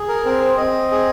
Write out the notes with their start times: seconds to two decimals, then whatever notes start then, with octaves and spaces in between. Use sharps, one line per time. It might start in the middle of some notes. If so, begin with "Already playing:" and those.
Already playing: G#4
0.08 A#4
0.25 C4 A#4
0.41 C5
0.57 C4 D#5
0.91 G#4